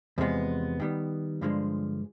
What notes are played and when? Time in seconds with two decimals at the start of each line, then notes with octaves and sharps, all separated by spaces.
0.18 E2 C3 F3 G#3 B3
0.80 D#3 G3 B3
1.41 G2 D3 F3 G#3